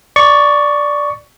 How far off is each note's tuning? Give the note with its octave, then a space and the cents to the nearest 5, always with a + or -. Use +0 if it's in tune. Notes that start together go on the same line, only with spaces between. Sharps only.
D5 +0 C#6 +10